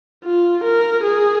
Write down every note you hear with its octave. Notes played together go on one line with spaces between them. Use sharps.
F4
A#4
G#4